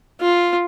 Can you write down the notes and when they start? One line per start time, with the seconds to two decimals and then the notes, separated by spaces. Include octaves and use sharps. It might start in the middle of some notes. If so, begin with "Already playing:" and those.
0.21 F4